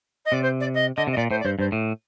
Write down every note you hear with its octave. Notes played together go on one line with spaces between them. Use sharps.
D#5
C3 D5
C5
D5
D#5
D3 D#5
C3 D#5
A#2 D5
A2 C5
D5
G2 C5
G2 C5
A2